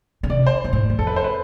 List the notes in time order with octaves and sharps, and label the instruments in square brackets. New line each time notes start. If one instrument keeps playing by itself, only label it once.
[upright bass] D3
[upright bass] C3 [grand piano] D5
[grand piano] C5
[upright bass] B2
A2
E2
[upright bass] F2 [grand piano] A4
[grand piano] B4
C5
B4